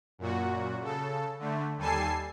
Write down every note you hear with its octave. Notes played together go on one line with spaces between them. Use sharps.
F#2 A#2 F#4
C#3 A4
D3 A3
D#2 G3 A4 G#5 A5 C7